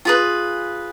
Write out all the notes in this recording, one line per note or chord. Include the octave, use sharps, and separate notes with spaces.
F4 G#4 B4